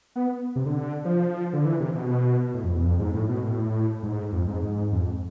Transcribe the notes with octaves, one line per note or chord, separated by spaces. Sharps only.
B3
C3
D3
F3
D3
E3
C3
B2
A2
F2
E2
F2
G#2
A2
B2
A2
G#2
F2
G#2
G#2
F2